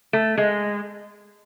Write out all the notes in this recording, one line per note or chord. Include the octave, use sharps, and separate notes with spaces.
A3
G#3